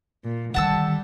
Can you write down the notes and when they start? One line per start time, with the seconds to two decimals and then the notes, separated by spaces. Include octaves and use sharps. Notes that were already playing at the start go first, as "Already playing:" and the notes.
0.24 A#2
0.54 D3 D#3 G3 F#5 A5 E6